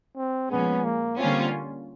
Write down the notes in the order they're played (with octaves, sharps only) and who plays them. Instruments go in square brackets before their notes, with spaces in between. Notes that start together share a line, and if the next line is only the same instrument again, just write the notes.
[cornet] C4
[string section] A#2 F3 G#3 C#4 [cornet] B3
[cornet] A#3
[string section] D3 G3 A#3 C#4 F4 [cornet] C4